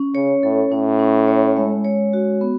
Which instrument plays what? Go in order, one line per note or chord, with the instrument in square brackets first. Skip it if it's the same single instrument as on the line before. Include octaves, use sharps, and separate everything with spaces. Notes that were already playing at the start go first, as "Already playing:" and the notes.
Already playing: [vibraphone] C#4
[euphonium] C#3 [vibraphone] C#5
[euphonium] A2 [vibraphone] A4
[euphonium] A2 [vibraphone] C#4
[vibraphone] C#4
C#5
G#3
C#5
F#4
B3